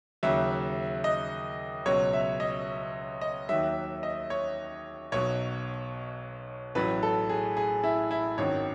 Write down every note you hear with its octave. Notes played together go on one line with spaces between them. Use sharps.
D#2 C#3 F#3 E5
D#5
C#2 B2 F#3 C#5
E5
D#5
D#5
D#2 D#3 F#3 E5
D#5
C#5
B1 B2 F#3 C#5
A1 A2 F#3 B4
A4
G#4
G#4
E4
E4
G#1 F#2 D#3 F#3 C#5